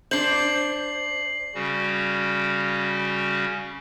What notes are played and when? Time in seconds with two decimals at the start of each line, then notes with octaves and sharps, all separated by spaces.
0.11 D4 C5 C7 F#7
1.55 C#3 G3 C#4 F#4